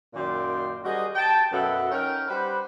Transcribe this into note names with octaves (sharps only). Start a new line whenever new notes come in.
F#2 A#2 D#3 D5 G5 C6
G3 F#4 G#4 A#4 C5 D#5
G5 A5
F#2 B2 A4 E5 F#5
C#4 D#4 A#4 G5
G3 B4 C5 F#5 B5